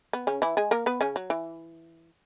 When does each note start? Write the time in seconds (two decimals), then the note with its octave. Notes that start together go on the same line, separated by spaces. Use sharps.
0.13 B3
0.27 C#3 C#4
0.42 E3 E4
0.57 G#3 G#4
0.71 A#3 A#4
0.86 B3 B4
1.01 C#3 C#4
1.16 F#3
1.30 E3